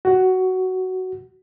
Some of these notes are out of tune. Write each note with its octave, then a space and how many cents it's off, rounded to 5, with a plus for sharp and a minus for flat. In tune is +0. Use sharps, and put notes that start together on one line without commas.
F#4 +10